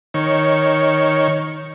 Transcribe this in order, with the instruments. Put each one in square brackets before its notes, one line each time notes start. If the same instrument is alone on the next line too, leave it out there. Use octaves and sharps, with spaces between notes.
[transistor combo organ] D#3 C#5